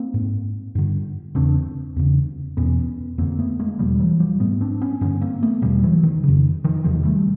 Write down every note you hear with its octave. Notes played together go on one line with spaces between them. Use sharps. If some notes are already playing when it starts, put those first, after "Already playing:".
Already playing: A#3 C4
G#2
G2 D3
E2 C#3 C4 D4
E2 C#3
E2 B2 B3 C#4
F2 D3 A#3 C4
A3 B3
G#3 A#3
E2 B2 F3 G3
E3 F#3
F3 G3
G#2 A3 B3
C4 D4
B3 C#4
G2 D3 B3 C#4
A#3 C4
A3 B3
E2 B2 F3 G3
E3 F#3
D#3
F2 C#3
D#3 F3
E2 C3 D#3 F3
G3 A3